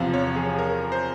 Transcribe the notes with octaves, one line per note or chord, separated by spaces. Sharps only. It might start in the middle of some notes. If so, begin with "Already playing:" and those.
Already playing: E2 C3 F3 F5
C#5
G#4
A#4
C5